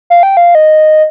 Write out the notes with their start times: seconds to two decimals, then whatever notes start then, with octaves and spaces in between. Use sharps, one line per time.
0.10 F5
0.23 G5
0.37 F5
0.55 D#5